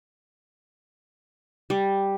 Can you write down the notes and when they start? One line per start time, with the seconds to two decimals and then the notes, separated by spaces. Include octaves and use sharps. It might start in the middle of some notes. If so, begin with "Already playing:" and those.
1.70 G3